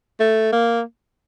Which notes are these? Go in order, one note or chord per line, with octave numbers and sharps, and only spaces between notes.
A3
A#3